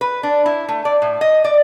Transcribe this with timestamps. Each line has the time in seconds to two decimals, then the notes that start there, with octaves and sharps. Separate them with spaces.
0.01 B4
0.23 D4
0.46 E4
0.69 A3
0.85 D5
1.02 A2
1.21 D#5
1.44 D5